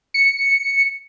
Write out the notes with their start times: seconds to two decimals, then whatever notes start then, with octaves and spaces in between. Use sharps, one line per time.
0.14 C#7